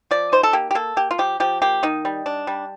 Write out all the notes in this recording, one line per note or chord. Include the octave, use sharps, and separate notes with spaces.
F3 D5
D#4 C5
A4
A#3 G4
G4
A#3 A4
A#3 G4
F4
F3 G4
F3 G4
A#3 G4
D#3 D#4
G3
D4
G3